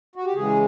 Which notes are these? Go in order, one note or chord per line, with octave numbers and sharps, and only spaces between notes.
F#4
G4
C#3 E3 G#3 G#4